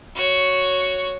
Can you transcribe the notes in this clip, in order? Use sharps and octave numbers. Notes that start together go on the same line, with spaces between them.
F#4 C#5